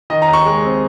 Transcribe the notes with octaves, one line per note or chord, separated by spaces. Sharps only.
D#3 D#5
A#5
D#2
C#6
G#3
C4